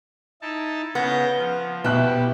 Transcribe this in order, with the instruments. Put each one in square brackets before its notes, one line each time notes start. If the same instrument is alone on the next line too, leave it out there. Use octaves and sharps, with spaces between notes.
[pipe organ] D#4 E4 A5
[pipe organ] C#3 G6 A#6 [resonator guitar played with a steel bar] B3
[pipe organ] F3
[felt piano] B2 F#6 [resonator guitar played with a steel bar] E4 [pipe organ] G4